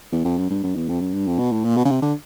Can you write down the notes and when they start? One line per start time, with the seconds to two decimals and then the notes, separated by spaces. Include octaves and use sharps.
0.12 E2
0.25 F2
0.38 F#2
0.50 G2
0.63 F#2
0.75 E2
0.89 F2
1.01 F#2
1.14 G2
1.27 F2
1.39 B2
1.52 A2
1.64 A#2
1.77 B2
1.85 C#3
1.90 C3
2.02 D3